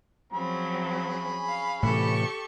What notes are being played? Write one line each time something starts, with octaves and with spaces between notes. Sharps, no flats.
F3 F#3 C4 C#4 G#4 B5
F5
A2 C3 E3 G4 A4 C#6